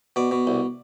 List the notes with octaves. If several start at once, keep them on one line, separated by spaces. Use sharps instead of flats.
B2 D5
B2
C2